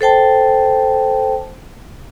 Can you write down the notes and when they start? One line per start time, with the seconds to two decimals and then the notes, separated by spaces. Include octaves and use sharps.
0.01 A4 C5 G5 A5